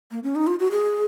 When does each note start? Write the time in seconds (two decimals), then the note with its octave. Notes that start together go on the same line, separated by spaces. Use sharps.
0.11 A#3
0.23 C#4
0.35 D#4
0.47 F4
0.59 F#4
0.71 G#4